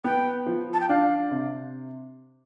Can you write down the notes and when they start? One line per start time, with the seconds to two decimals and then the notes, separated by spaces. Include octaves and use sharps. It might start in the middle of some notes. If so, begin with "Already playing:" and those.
0.04 B3 G5
0.46 F3
0.73 A5
0.80 G5
0.89 D4 F5
1.31 C3